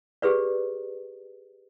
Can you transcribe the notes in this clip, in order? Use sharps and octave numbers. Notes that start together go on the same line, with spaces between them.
G4 G#4 B4 D5